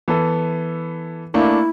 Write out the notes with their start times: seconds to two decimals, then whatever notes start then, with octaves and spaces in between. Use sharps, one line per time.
0.08 E3 B3 A4
1.34 A3 A#3 D4 E4